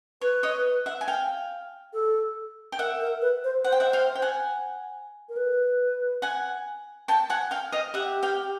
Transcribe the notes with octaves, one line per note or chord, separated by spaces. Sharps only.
B4 C#5
C#5 D#5
E5 F#5
G#5
F5 G5
A4
G5
A#4 E5 F#5
A#4
B4
C5
C5 F#5
G5
E5 F#5
F5 G5
G5
F#5 G#5
A#4
B4
F#5 G#5
G5 A5
F#5 G#5
F5 G5
D#5 F5
G4 E5 F#5
F5 G5